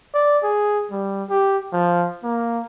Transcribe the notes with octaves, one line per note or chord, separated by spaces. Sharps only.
D5
G#4
G3
G4
F3
A#3